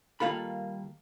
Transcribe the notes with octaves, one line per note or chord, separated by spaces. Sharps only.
D#3 G3 A#3 F4 A4 B5